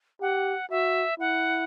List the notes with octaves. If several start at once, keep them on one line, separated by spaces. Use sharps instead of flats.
G4 F#5
F#4 E5
E4 F#5